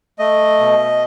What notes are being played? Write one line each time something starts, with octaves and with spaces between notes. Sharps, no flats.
A3 D#5
B2